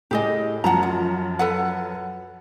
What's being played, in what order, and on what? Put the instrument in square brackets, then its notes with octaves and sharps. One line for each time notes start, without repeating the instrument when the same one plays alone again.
[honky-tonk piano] A2 [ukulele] G4 G#4 D#5
[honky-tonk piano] F#2 F3 [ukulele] F#5 A5 A#5
[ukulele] F4
A4 B4 F#5